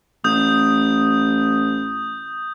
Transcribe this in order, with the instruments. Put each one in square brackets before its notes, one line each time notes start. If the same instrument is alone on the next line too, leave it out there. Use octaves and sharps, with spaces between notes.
[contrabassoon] A1 [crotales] D#6 G6